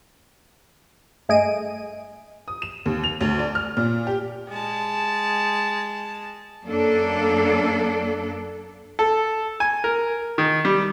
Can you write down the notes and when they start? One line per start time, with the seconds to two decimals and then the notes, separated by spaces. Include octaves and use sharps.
1.29 G2 A3 G#4 D#5 D7 D#7
2.48 D#6
2.62 E7
2.86 D#2
3.04 F7
3.21 D2
3.39 D5
3.55 F6
3.77 A#2
4.07 G4
4.49 G#3 A5
6.64 F#2 A#3 D4 A4
8.99 A4
9.60 G#5
9.84 A#4
10.38 D#3
10.65 G3